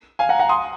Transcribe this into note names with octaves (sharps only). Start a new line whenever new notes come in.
F5 G#5
F#5 A#5
F#5 A#5
C6 D#6